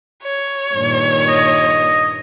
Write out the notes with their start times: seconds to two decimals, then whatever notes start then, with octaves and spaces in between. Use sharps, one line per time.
0.23 C#5
0.75 G2 A#2 D#3
1.28 D#5